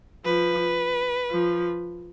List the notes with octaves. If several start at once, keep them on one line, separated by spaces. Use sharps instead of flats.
F3 B4
F3